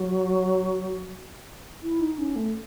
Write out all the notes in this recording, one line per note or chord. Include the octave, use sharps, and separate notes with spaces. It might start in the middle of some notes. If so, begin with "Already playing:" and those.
Already playing: F#3
E4
D#4
C#4
A3